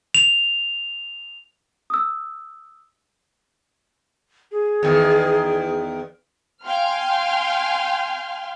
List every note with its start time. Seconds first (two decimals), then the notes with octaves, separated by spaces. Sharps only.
0.15 F7
1.90 D#6 E6
4.52 G#4
4.83 E2 D#3
6.64 F5 G5 G#5 C6 F6